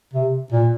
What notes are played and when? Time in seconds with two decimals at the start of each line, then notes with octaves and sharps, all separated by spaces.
0.13 C3
0.52 A#2